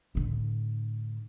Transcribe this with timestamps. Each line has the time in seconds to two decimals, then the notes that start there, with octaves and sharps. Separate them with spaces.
0.15 A2 D3